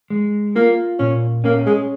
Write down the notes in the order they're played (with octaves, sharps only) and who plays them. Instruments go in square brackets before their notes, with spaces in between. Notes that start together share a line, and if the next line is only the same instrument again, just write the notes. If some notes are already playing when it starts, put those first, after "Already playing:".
[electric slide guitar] G#3
[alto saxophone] A#3 [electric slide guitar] F4
[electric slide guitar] A#2 [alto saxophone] C#4
[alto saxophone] A#3 [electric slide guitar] C#4
[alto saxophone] G#3